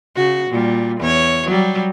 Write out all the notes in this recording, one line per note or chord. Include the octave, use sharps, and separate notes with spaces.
C#3 F#4
A#2 G3
E2 C#5
F#3 G3